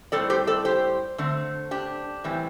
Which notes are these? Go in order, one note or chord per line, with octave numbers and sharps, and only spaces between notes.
A2 G3 C4 A4 D5
G4 C5
A4 D5
G4 C5
D3 A3 C4
D4 G4
A2 E3 G3 C4